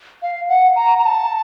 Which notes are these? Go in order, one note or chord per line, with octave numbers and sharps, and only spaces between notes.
F5
F#5
A#5
A#5
A5